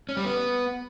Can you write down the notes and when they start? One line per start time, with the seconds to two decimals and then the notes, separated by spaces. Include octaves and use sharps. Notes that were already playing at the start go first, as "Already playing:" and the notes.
0.09 C#4
0.17 G3
0.25 B3